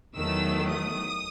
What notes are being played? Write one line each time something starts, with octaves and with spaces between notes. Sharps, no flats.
E2 D#3 F#3 A3 E6
D#6